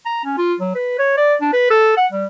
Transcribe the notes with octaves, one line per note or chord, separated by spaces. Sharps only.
A#5
C#4
F4
F#3
B4
C#5
D5
D4
B4
A4
F#5
G3